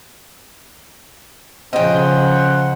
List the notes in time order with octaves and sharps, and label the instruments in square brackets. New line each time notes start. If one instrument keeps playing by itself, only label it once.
[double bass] C#3 F3 [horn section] C#4 C5 F#5 [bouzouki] D#5 G5